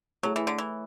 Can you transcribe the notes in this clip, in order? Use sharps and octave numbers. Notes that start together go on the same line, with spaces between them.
F#3 A3 E4 G#4 C#5
E3
D3
E3